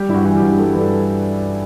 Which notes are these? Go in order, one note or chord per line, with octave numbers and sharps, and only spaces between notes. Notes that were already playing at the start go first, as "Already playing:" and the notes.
Already playing: G3 G4
G2 E4
F#4
E3 F#4
G4
G2
G4
G3 A4
B4
G2 A4